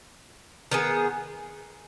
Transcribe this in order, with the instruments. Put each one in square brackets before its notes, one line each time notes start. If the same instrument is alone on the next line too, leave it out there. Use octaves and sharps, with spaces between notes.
[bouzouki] D#3 B3 G#4